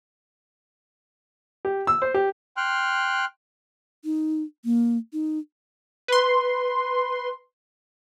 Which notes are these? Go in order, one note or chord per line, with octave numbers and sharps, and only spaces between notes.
G4
E6
C5
G4
G5 C6 F6 F#6
D#4
A#3
D#4
B4 C6